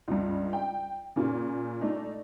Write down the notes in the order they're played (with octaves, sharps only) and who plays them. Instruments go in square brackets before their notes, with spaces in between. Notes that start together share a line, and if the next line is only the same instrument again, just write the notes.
[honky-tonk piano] C#2 G2
G5
A#2 C#3
A3 D4 D#4